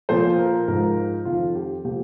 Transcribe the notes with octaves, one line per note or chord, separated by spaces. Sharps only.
A#2 F3 C5
A#4
G#2 F3 A#4
F2 D#3 F4
G4
A#2 F3 G4